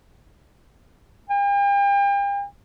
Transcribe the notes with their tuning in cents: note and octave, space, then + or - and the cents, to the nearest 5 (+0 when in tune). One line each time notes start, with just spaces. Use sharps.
G5 +40